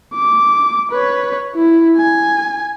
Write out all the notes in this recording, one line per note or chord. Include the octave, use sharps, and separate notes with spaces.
D6
B4 C#5
E4
G#5